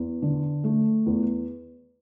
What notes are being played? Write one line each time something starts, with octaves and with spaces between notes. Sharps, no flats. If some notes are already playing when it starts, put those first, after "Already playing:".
Already playing: E2
D3
A3
E2